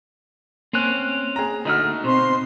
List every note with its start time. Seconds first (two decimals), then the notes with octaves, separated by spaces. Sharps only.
0.73 A#3 C4 C#4 F#6
1.36 G#4 A#5
1.65 D3 A3 D#4 F#4 F6
2.04 B2 C4 C5 C6